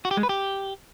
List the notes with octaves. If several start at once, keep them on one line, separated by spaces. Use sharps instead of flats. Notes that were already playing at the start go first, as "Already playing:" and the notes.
F#4
G4
G#3
B4
G4